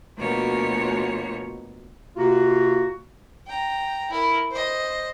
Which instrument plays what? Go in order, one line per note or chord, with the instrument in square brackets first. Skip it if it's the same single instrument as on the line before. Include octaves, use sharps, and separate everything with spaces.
[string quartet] D2 B2 F3 A#3 C#5
[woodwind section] C3 A#3 F4 F#4
[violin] G5 A#5
E4 A#4
C5 D#5